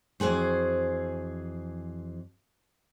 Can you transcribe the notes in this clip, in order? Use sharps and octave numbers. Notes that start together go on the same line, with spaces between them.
F2 E3 F#4 G#4 C5